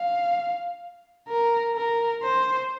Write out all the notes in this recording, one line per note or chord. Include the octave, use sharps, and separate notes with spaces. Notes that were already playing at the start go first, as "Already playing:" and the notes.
Already playing: F5
A#4
A#4
C5